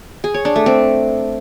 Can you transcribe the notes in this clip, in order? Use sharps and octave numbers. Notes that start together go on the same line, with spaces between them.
G#4
C#5
D4
A3
C4